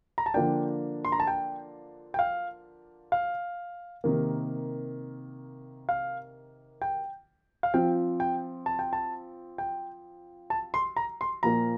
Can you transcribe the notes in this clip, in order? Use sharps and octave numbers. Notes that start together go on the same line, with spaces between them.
A#5
A5
D3 F3 A#3 D4 G5
C6
A#5
A5
G5
G5
F5
F5
C3 D#3 A#3
F5
G5
F5
F3 C4 F4 G5
G5
A5
G5
A5
G5
A5
C6
A#5
C6
A#2 F3 A#3 A#5